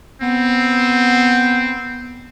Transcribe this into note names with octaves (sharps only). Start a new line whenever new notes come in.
B3 C4